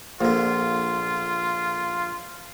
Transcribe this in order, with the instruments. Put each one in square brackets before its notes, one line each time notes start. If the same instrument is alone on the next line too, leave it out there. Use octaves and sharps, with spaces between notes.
[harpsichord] A#1 D3 [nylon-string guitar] A#3 [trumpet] F4